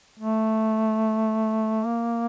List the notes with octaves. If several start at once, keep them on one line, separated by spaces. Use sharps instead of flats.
A3
A#3